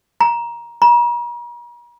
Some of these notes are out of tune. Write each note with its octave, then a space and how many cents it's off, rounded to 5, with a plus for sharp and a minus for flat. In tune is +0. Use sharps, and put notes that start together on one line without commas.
A#5 +20
A#5 +45